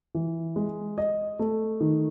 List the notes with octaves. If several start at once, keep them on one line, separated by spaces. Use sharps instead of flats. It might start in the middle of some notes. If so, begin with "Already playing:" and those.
E3
G#3
D#5
A3
D#3